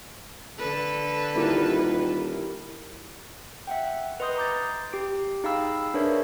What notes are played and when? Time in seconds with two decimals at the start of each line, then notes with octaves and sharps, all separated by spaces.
0.58 D3 A4 B4
1.35 D#1 E4 G4 A#4
3.67 E5 F#5 G5
4.20 B4 D#5 C6 D#6 G6
4.37 A#5 D6 G6 A6
4.93 G4 D7
5.44 D#4 G#4 F5 G5 B5 E6
5.94 D4 G#4 A#4 B4 C#5 E5